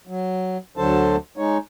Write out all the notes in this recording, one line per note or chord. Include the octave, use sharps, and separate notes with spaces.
F#3
D2 D3 F#3 A4 C5 A5
G#3 D#4 C#5